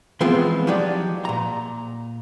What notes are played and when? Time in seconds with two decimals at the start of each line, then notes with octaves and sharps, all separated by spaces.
0.21 E3 F3 G#3 B3 C4 F4
0.67 F3 F#3 D#4 G4 D5
1.25 A#2 A#5